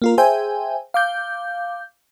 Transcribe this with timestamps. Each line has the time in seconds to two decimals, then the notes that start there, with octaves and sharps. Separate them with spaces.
0.02 A#3 F4 A#4
0.18 G#4 C5 E5 G5 G#5
0.94 F5 D6 G6